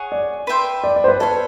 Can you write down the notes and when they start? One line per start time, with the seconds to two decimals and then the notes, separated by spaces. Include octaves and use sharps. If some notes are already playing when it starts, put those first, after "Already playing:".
Already playing: G#4 C#5 F#5
0.12 D5
0.47 B4 E5 G5 C6
0.84 D5
0.96 D5
1.04 C5
1.08 B4
1.20 A4 B4 C#5 F5